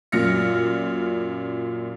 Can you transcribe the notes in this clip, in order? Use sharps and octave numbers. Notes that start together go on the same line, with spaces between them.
F#2 A#2 F6 A#6 C#7